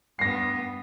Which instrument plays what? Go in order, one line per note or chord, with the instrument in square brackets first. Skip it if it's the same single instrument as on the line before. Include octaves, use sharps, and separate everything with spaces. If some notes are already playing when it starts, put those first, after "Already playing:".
[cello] G2 B3 [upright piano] A#6 C7